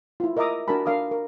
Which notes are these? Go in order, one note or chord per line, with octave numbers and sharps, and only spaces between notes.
E4 F4
A#4 D#5 E5 A#5 D6 D#6
D4 F#4 A#4 G#5 A5 B5
D4 A#4 F5 D6 D#6
A#4